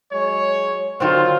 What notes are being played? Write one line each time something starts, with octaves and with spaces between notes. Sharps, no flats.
F#3 G#3 C#5
D3 D#3 F#3 C4 F4